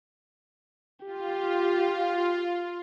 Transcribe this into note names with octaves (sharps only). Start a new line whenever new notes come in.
F4 G4